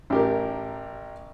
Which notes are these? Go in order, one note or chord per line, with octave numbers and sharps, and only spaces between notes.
A1 G4 A#4